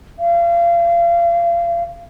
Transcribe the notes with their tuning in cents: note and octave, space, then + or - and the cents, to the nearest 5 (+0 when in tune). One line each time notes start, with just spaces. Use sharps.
F5 -30